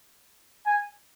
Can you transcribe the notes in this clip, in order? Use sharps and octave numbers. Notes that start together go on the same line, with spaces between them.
G#5